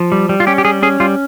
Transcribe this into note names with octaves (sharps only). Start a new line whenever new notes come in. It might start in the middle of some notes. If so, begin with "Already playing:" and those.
Already playing: F3
G3
G3
F4
C#4 G4
G4
G3 G#4
C#4 G#4
G3 F4